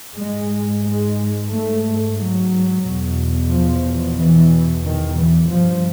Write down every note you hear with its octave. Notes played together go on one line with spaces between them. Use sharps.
G#2 G#3
G#3
A3
F#3
E2 B2
F3
E3
D#3
E3
G2 F3